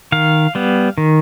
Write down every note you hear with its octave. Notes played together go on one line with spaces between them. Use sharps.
D#3 F5
G3 B3
D#3